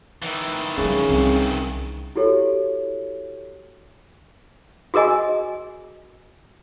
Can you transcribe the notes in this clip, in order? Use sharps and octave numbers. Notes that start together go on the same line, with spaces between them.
D#3 E3
C#3 G3 G#3
C2
E4 F#4 G4 A4 C#5
F#4 G#4 A#4 D#5 G#5